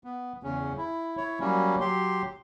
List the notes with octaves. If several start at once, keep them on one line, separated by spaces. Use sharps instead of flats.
B3
E2 C#3 C#4
E4
E4 C#5
F#3 G3 A#3 C#4
F#3 G4 C6